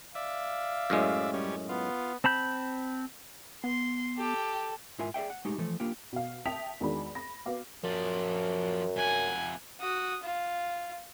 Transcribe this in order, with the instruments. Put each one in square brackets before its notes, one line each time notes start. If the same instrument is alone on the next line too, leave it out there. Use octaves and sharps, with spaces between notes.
[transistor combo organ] D5 E5 [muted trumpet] F5
[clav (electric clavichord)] F#2 A2 G#3
[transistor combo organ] G3 C#4
[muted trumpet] B3 [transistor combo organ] F4
[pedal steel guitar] C4 A5 B5 G6
[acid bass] B3 [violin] C6
[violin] G4 [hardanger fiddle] A4
[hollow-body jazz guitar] G#2 E4 F4 A#4 E5 G#5
G#4 D5 E5 G5
F#5
G#3 A3 D#4 G4
E3 F3 A3
A#3 D4 F4 G4
[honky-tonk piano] B2 F5
E5 G5 A5 D#6 B6 F7
E2 D#3 G#3 D4 F#4 B5
B5 A#6
B3 F#4 F5 D6
[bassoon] F#2 [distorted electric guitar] F3 D5
[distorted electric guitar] F2 F#5 [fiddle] G#5
[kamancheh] F#4 D#6
F4